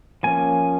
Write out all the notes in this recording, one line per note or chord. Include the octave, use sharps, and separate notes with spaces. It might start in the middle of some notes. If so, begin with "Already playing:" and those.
F3 A#3 C#4 G#5